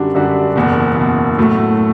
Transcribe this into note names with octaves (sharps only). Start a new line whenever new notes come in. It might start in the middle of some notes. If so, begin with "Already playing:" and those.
Already playing: F#2 D3 G3 D4 F#4
F#2 D3 G3 D4 F#4
F#1 E2 B2
F#1 E2 B2
A2 F#3 A3